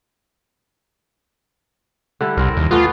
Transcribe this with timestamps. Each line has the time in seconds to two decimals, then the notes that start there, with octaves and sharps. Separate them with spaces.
2.21 D3 G3 E4
2.37 C2 C4 A#4
2.57 D#2
2.71 E3 A3 B3 F4